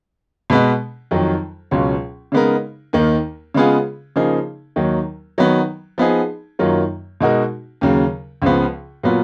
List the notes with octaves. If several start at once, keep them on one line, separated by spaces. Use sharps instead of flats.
B2 G#3 B3
F2 D#3 F#3
C#2 B2 F#3 C#4 F4
C#3 G#3 B3 D#4 A#4
D#2 D#3 A#3
C#3 G#3 B3 F4 G#4
C#3 F3 A#3 D#4 G#4
D#2 D#3 F#3
D#3 F#3 B3
F3 B3 D#4 G#4
F#2 D#3 F#3 A#3 F4
B2 G#3 D#4 F#4 A#4
D#2 C#3 F#3
C#2 C#3 F3 B3
A#2 F#3 B3 F4